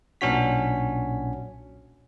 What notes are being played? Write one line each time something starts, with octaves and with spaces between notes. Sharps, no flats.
B1 A#2 C#4 D4 F#4 B6